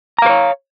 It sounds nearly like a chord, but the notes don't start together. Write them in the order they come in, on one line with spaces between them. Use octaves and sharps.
A#5 F5 C5 C#5